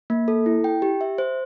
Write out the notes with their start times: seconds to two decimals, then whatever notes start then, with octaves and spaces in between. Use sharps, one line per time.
0.10 A#3
0.28 A4
0.46 E4
0.64 G5
0.82 G4
1.01 E5
1.18 C5